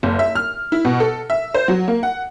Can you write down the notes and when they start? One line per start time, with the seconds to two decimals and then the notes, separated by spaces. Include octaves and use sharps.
0.03 F#1
0.19 E5
0.35 F6
0.72 E4
0.85 B2
1.00 A4
1.30 E5
1.54 C5
1.68 F#3
1.88 A#3
2.03 F#5